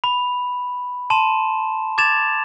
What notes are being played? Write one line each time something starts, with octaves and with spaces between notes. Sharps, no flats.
B5
A5 C6 E7
D6 G#6 A6 E7 F7